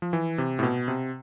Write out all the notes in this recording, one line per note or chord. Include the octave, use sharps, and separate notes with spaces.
F3
E3
C3
A2
B2
C3